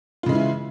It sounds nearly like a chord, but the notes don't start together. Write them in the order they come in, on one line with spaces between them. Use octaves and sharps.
F4 C#3 G#3 E3 E4